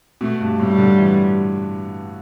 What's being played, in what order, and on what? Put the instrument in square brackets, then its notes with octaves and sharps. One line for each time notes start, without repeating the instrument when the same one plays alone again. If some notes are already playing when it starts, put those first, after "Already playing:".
[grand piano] B2 [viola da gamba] A3
[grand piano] G2
[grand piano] A2 [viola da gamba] G3
[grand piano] D3
E3